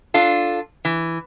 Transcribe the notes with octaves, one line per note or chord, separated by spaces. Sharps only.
D4 F4 A4
E3